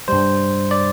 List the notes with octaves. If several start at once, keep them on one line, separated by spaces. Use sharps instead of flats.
G2 G3 C5
D5